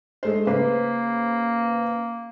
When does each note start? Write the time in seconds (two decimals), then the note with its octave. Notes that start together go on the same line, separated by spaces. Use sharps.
0.23 G#3 A3 C5
0.47 C#3 A#3 B4 C5